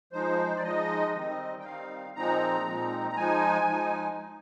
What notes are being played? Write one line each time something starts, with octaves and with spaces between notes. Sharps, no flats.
F3 G#3 D#4 C5
D5
F3 G#3 D#4 D#5
D#3 G3 C4 D#4
G5
D#3 G3 C4 D#4 F5
A#2 F3 G#3 C4 D#4 A#5
A#2 F3 G#3 C4 D#4
A#5
F3 G#3 D#4 G#5
F3 G#3 D#4